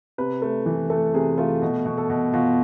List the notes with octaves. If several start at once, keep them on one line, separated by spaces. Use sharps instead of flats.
C3 B4
A3
E3
A3 A4
C3 G#4
A3 F4
B2
B2
A4
B2
B2 F4